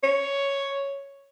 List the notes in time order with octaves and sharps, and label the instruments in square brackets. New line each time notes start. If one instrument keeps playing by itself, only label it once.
[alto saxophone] C#5